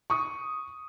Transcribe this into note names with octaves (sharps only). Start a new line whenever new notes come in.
C#6 D#6